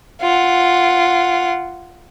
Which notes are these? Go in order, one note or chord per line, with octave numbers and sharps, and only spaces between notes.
F4 F#5